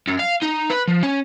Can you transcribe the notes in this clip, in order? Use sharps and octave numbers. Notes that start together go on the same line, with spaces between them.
F#2
F5
D#4
B4
F3
C#4